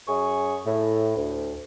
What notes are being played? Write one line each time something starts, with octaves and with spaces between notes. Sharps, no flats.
F#2 G#4 C#6
A2
D2